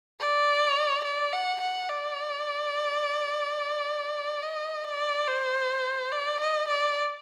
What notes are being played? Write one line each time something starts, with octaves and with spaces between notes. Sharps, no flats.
D5
D5
F#5
F#5
D5
D#5
D5
C5
D5
D#5
D5